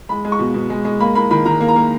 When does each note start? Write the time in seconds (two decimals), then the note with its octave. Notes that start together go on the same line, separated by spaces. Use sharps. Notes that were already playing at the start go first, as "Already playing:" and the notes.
0.09 G#3 B5
0.25 G#3
0.32 C#6
0.39 B2
0.54 B2
0.70 G#3
0.85 G#3
1.00 A#3 B5
1.15 A#3 B5
1.31 D#3 B5
1.46 D#3 A#5
1.60 A#3
1.68 A#5
1.76 A#3